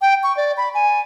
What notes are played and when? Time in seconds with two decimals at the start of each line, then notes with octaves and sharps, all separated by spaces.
0.02 G5
0.23 C#6
0.37 D5
0.57 B5
0.74 G#5